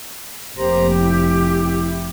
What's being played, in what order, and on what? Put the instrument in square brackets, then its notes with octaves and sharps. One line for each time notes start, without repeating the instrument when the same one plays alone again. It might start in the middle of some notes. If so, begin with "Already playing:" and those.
[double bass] F1 [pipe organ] A#3 C5 A#5 [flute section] G4
[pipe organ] E4